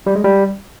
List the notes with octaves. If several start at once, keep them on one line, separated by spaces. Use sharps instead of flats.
G3
G#3
G3